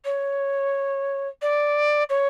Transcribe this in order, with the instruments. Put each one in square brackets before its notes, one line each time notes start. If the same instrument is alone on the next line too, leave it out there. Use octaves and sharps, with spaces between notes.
[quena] C#5
D5
C#5